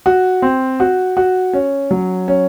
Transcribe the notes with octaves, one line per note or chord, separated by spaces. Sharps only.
F#4
C4
F#4
F#4
C#4
F#3
C#4